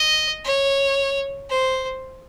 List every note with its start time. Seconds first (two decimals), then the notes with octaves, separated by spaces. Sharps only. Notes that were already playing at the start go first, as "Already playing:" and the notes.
Already playing: D#5
0.44 C#5
1.49 C5